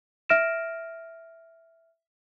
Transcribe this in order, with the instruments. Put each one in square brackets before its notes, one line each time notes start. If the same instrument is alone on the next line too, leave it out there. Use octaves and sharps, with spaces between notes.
[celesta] E5 F6 A#6 D7 E7